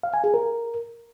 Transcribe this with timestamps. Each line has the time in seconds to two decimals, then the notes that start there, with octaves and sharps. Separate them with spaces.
0.03 F5
0.14 G#5
0.24 G#4
0.34 A#4